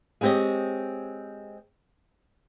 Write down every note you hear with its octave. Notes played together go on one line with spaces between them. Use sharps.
G#3 B3 C4 G4 C#5 D#5